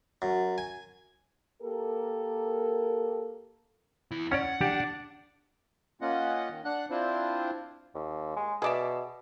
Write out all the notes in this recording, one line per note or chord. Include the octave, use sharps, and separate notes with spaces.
F#2
G#5
A#3 G4 A4 A#4
E2 E4
C#4 C#5 D5 F#5
D4 G4
A#3 C#4 F4 D#5 F#5
D#3
D4 F#5 F#6
C4 D4 E4 F4 C5
D#2
G#3
B2 G#4 D5 E5